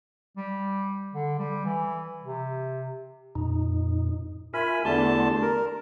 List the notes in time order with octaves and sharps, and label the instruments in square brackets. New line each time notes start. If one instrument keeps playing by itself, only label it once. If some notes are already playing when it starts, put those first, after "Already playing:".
[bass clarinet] G3
D3
G3
E3
C3
[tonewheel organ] F2 A#2 D#4
[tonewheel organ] F4 A#4 E5 [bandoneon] G#5 B5
[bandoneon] E2 D3 A5 [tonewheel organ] A3 G4 C6
[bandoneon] A#4